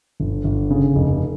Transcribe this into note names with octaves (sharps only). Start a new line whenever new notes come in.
G1
G1
C#3
F1